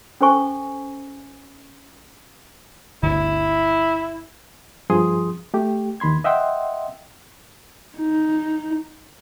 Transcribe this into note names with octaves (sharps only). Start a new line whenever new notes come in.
C#4 A4 C5 G#5 C#6
G1 D2 D3 E4
G2 F3 G#4 C6 D#6
A3 G4
D#2 D#3 B5 C6 G#6
D#5 E5 F#5 G5 C6
D#4